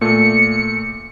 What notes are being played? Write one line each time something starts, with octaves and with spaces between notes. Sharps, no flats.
A#2 A3 C#7